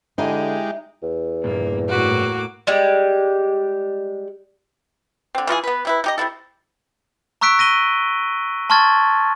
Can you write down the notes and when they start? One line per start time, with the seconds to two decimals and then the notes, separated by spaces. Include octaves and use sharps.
0.18 D3 G#3 D#4 E4 G4 G#4 D#5
1.03 E2
1.44 G2 A#2 A#3
1.89 A2 A#3 F#4 D6
2.67 G3 G#3 G4
5.35 D3 C4
5.47 E3 F4 F#4 G#4
5.64 B3 B4
5.85 C3 E4 B4
6.04 D#4 G4 D#5
6.18 C3 B3 E4 A4
7.41 A#5 C#6 E6 F#6 B6 D7
7.59 A#6 D#7 G7
8.70 A5 C6 C#6 F6 G#6 A6